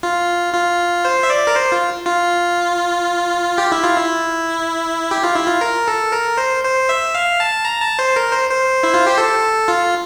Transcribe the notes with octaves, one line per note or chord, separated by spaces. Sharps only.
F4
F4
C5
E5
D5
A#4
C5
F4
F4
G4
E4
F4
E4
G4
F4
E4
F4
A#4
A4
A#4
C5
C5
E5
F5
A5
A#5
A5
C5
A#4
C5
C5
E4
F4
G4
A4
F4